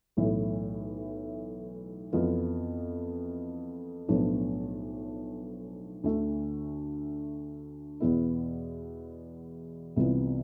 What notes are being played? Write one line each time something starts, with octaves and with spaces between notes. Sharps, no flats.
B1 A2 E3
F2 E3 B3 F4
B1 A2 F3 B3 D4
D2 D3 A3
E2 B2 B3 E4
C2 C3 E3 B3 F4